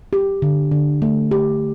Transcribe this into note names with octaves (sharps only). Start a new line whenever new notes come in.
G4
D3
D3
A3
G4